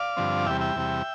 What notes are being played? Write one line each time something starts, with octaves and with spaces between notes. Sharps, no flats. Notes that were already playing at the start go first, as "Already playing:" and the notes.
Already playing: D5 F5
G2 D3 F3 C4
E2 C3 G3 E5 G5
E5 G5
E2 C3 G3